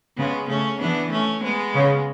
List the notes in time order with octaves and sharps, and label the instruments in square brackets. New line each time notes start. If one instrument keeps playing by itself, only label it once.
[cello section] C#3 [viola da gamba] G#3 B3
[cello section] C#3 [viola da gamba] A3 C#4
[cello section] E3 [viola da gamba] B3 D4
[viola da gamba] A3 C#4
G#3 B3
[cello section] C#3